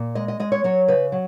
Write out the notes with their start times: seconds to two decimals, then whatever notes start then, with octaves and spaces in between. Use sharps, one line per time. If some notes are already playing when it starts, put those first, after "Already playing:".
Already playing: A#2
0.15 G#3 D#5
0.28 D#5
0.40 G#3 D#5
0.52 C#5
0.64 F#3 C#5
0.88 C#3 B4
1.12 F#3